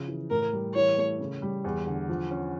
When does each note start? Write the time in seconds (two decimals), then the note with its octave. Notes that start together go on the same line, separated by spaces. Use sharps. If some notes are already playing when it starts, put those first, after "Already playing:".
Already playing: C#3 F3
0.08 E3
0.30 A2 A#4
0.53 G3
0.75 E3 C#5
0.98 A3
1.20 C#3
1.42 G3
1.64 E2
1.87 D3
2.09 F3
2.31 C#4